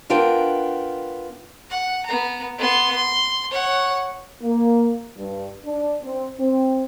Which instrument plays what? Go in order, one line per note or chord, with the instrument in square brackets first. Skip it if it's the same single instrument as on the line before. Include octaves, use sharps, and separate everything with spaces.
[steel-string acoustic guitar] B3 D4 F4 A#4 G5
[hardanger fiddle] F#5
B3 A#5
B3 C6
C6
C#5 F#5
[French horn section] A#3
G2
D4
C4
C4